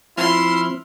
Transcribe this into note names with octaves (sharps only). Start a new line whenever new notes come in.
F3 C4 E4 C6 F6